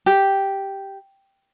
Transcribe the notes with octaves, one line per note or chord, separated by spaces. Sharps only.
G4